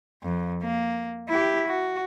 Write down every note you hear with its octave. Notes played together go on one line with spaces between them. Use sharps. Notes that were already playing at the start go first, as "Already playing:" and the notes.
F2
A#3
E4 G4
F#4